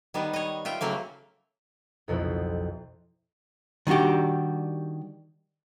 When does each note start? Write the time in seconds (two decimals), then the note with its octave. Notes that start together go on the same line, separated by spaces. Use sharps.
0.14 D#3 G3 B3
0.33 C#5 D#5
0.65 F4 E5 G5
0.81 C#3 F#3 A3 A#3
2.08 B1 F2 B2 C4 E4
3.87 D#3 G3 D4 F#4 G4